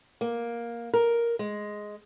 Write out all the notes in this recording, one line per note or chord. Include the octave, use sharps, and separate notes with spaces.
A#3
A#4
G#3